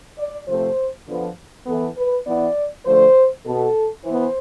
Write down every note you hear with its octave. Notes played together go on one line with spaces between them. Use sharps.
D5
C3 F3 A3 C4 C5
D3 F3 B3
E3 B3 A4
B4
E3 B3 D5
D3 F3 A3 C5
B2 B3 A4
E3 B3 C5